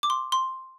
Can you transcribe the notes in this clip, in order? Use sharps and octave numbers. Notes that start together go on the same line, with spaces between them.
D6
C6
C6